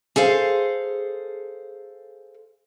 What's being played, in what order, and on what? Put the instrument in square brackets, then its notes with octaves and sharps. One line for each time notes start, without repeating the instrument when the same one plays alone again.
[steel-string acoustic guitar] G#4 A4 C5 F5